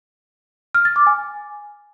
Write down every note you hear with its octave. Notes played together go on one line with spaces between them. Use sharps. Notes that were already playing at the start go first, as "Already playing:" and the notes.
F6
A6
D6
G#5